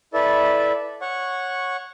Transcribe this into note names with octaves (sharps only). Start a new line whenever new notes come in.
E4 A4 B4 D5 E5
C#5 F#5 C#6